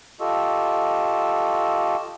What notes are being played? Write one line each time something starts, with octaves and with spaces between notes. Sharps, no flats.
F4 G4 A4 D#5 C#6 E6